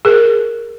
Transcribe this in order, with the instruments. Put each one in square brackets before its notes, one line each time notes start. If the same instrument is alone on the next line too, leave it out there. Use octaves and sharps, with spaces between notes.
[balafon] G#4 A#4